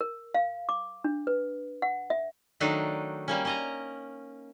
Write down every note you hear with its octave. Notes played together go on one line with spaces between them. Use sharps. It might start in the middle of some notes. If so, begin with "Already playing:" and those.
A#4
F5
D6
D4
B4
F#5
E5
D#3 F#3 A3 D4 D#4
G3 A#3 C#4
C#4 D#5 A#5